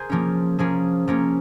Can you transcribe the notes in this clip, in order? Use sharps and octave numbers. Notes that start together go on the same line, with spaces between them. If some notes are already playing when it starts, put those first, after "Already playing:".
Already playing: G#4 A#4 C5
F3 A#3 C#4
F3 A#3 C#4 G#4
F3 A#3 C#4